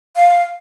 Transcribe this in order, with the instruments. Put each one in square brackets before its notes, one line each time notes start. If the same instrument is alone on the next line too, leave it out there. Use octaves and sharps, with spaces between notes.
[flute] F5